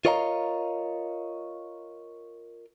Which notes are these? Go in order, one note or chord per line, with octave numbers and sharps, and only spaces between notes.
F4 A#4 C#5 D#5 F5 A#5